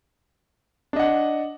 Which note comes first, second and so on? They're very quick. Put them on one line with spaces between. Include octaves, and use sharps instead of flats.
D4 D#5 F#5